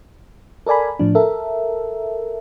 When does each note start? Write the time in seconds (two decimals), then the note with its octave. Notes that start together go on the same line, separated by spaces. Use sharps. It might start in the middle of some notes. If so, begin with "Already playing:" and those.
0.66 A4 A#4 D5 G#5 B5
0.99 A2 F3 D4
1.15 A4 A#4 E5